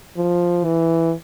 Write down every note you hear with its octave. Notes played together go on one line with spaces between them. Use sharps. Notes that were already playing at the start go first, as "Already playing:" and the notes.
F3
E3